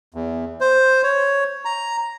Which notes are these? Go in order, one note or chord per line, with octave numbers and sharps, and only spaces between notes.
E2
C5
C#5
A#5